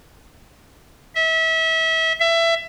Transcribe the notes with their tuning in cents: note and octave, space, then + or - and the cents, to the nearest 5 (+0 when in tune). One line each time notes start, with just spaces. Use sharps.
E5 -30
E5 +20